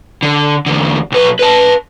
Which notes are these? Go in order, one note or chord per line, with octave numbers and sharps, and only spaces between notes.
D3
E2 D3
B1 B4
B4 A5